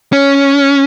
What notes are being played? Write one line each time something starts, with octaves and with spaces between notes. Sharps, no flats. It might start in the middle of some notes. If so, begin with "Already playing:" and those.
C#4